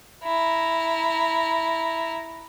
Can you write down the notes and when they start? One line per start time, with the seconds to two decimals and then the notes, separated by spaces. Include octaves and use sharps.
0.24 E4 A#5